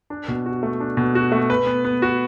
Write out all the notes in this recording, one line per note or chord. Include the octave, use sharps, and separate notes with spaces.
D4
B2
F#4
A3
D4
B2
F#4
A3
B4
B3
B3
F#4